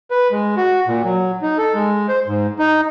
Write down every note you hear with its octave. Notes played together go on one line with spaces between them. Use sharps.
B4
G#3
F#4
A#2
F#3
D#4
A4
G#3
C5
G#2
D#4